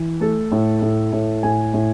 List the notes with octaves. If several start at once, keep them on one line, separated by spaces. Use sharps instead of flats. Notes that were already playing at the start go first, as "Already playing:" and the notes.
Already playing: E3
A3 A4
A2
A2
A2
A2 G#5
A2